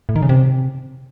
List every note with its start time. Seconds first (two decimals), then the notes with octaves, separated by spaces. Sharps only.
0.09 A2
0.16 D#3
0.22 C#3
0.29 C3